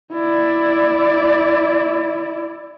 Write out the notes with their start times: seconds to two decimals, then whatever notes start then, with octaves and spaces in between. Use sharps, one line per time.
0.13 E4 D5